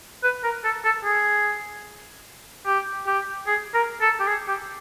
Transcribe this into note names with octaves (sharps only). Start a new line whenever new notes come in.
B4
A#4
A4
A4
G#4
G4
G4
G#4
A#4
A4
G4
G#4
G4